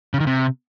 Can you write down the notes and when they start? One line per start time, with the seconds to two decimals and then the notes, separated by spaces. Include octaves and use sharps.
0.14 C#3
0.20 D#3
0.27 C3